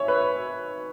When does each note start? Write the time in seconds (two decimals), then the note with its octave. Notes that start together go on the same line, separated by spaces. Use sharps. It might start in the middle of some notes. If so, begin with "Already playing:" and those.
Already playing: D#3 C#5 E5 G#5
0.08 B4